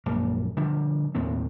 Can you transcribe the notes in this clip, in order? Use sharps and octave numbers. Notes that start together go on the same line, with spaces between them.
A#1 F#2 A#3
D3 F3 G3
D#2 A2 C4